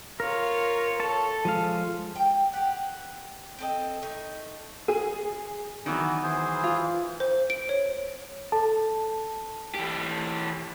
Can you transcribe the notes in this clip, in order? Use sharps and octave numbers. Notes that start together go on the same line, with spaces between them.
F4 A#4 C#5
A4 C#5 A5
F3 G#3 F5
G5
G4 F#5
C4 A4 D#5
A3 D#4
G#4 D#7
D#3 E3 F#3 B3
E3 G#4 C5
F4
C5
D7
C#5
A4 A5
E3 G4